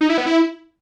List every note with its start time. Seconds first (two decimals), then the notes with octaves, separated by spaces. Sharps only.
0.01 D#4
0.09 E4
0.18 B3
0.26 E4